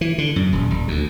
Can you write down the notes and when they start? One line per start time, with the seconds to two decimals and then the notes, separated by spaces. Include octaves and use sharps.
0.01 E3
0.18 D3
0.36 F#2
0.52 D#1
0.71 D#1
0.88 D2